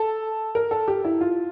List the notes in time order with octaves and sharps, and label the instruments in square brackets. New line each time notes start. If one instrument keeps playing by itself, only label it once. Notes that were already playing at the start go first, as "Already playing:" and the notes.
Already playing: [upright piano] A4
A#4
A4
G4
E4
F4